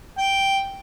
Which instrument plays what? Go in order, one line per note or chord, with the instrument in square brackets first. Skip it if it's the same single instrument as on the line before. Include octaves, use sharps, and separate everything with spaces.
[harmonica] G5